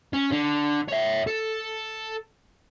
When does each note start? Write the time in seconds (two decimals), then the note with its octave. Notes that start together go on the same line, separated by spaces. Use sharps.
0.13 C#4
0.31 D3
0.88 C#5 E5
1.27 A4